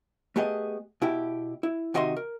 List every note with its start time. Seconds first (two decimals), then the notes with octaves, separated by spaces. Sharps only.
0.36 A3 B3 G4 G#4 D#5
1.02 B2 E4 G4
1.63 E4
1.94 C3 D#3 F#4 D#5 E5 C6
2.17 A#4